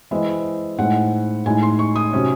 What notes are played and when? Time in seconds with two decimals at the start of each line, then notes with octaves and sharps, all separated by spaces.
0.11 E3 G#3 C4 E4 D#5
0.78 A2 G#3 C4 D#4 F#5
1.46 A2 G#3 D#4 G#5
1.63 C6
1.79 C#6
1.96 D#6
2.13 C3 F#3 C#4